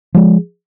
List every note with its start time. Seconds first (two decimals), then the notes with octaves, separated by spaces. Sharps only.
0.15 F3 G#3